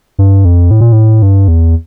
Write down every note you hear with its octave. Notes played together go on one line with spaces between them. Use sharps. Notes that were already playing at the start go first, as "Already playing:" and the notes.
G2
F2
A2
A#2
A2
G2
E2